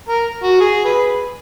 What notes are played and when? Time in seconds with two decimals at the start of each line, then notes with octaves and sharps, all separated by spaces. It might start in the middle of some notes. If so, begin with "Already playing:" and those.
0.09 A#4
0.43 F#4
0.61 G#4
0.85 G#4 B4